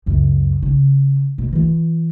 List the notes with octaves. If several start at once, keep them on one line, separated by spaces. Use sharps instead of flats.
C#2 F#2
C#3
B2
E3 F4